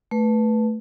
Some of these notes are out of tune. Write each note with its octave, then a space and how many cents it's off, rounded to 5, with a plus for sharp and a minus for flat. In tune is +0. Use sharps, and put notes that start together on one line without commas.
A3 +0 B4 -5